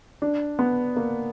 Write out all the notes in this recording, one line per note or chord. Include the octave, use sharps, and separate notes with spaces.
D4
B3
A#3